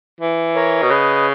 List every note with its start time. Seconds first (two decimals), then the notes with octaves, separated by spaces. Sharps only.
0.21 E3
0.55 A#4 C#5
0.82 B2
0.90 C#3 B4 D#5